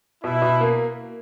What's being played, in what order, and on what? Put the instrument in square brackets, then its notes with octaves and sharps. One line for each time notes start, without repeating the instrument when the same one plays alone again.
[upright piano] B2 [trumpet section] E4
[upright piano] B2
A#3